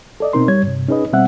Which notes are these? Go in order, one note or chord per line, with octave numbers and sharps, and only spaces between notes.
A4 D5 D#5
B2 C4 D#4 A#4 C6
G3 C#5 G#6
G2 C3
C#4 D#4 G#4 B4 D#5
B2 G3 C4 E5 F#5 F#6